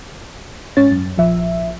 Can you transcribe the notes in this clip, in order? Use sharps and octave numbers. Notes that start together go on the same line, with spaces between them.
G#2 C#4 C#5 A6
F#2
A#1 F3 E5